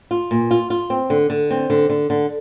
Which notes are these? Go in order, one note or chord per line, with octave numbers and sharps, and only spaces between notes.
F4
A#2
F4
F4
C4
D3
D3
C4
D3
D3
D3